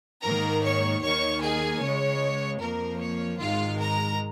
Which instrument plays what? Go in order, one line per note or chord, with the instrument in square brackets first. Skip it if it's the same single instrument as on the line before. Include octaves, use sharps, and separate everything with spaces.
[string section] G#2 D#3 A#3 A#4 A#5
C#5 C#6
D#2 D#3 A#3 C#5 C#6
G#4 G#5
C#2 C#3 G#3 C#5
F2 F3 A#3 A#4
C#5
G#1 G#2 D#3 G#3 F4 F5
A#4 A#5